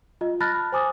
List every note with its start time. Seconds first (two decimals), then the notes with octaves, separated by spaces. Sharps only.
0.21 F4 D#5
0.40 A5 B5 F6 F#6 A6 A#6
0.72 C5 G#5 D6 D#6 A6